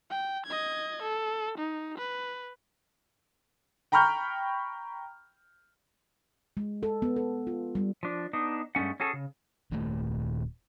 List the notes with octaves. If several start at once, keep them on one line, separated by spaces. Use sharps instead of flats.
G5
D#5 G#6
A4
D#4
B4
G5 A#5 B5 C#6 F6 G6
G#3
A4
B3
A4
F4
G3
F3 D4
B3 D4 D#4
G2 G#3 A3 C#4 F#5
C#4 F#4 G#4 A4
C#3
D#1 D#2 A#2 A3